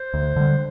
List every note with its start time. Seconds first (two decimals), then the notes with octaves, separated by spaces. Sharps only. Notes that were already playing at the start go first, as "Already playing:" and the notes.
Already playing: C5
0.14 D2
0.36 D3 G3